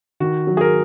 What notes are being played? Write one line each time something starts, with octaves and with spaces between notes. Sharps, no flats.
D#3 F#4
F#3
G#4
A#4